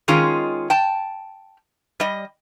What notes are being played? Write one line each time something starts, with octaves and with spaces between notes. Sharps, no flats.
D#3 G#3 C#4 F4 G#4
G5 A5
G3 D#5